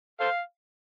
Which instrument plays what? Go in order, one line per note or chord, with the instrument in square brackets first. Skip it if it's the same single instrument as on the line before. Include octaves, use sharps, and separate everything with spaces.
[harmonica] A4 C5 F5